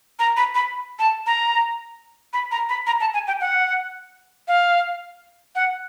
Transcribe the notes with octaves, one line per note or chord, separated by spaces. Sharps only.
A#5
B5
B5
A5
A#5
B5
A#5
B5
A#5
A5
G#5
G5
F#5
F5
F#5